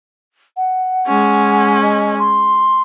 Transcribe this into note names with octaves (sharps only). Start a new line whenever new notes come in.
F#5
G#3 C#4
D#5
C6